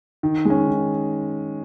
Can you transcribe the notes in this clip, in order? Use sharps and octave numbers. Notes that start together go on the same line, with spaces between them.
D#3
G#3 C#4
D#3